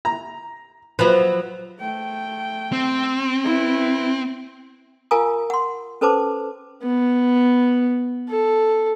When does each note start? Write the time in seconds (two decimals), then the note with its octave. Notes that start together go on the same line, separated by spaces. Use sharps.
0.05 A#5
0.99 F3 F#3 B4 B5
1.79 A3 G5
2.73 C4
3.44 E4 B4
5.11 F4 A#4 F5 G#5 A#5 D#6
5.50 F#5 C6
6.01 C#4 A4 B4 C5 A5 D6
6.83 B3
8.29 A4